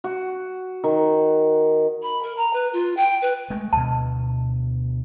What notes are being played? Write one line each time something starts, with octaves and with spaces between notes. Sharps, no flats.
F#4
D#3
B5
A#4
A#5
B4
F4
G5
B4
G#3 A3
D2 B2 A5